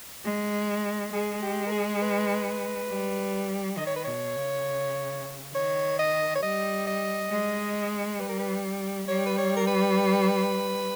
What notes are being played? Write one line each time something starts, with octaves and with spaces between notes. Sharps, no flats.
G#3
G#3 G#4
G4
A#4
G#4
B4
G3
D#3 D#5
C#5
B4
B2 C#5
C#3
D#3 C#5
D#5
C#5
G3 D#5
D#5
G#3
G3 B4
A#4
B4
G3 C#5
B4
C#5
A#4
B4